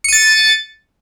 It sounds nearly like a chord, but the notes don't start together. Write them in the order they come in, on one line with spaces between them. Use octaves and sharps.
C#7 D#7 A6